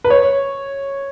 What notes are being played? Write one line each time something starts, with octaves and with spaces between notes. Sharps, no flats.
B4
C#5